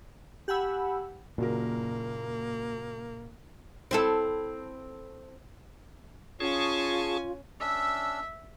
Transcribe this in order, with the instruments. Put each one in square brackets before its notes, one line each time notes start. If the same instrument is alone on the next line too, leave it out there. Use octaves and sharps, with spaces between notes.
[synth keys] G4 F#5 G#5 B5 E6
[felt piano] F#1 F#3 A#4 [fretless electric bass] A#2 [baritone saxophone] A#3
[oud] C4 E4 A4
[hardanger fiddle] C#4 G#5 [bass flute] F4 [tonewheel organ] G#4 A5 C#6
[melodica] C#4 D4 E6 [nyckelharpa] E5